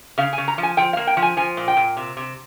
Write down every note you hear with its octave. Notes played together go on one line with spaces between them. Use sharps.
C#3 F5
G#5
C#3
A#5
F3
G#5
F3 G5
F5
A#3
G5
F3
G#5
F3 G#5
A#2
G5
A#2
C3
C3